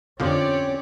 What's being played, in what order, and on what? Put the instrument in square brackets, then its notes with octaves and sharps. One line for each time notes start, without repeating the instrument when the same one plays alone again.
[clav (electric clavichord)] F2 D3 F3 [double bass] C4 C#4 [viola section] G4 C#5 D5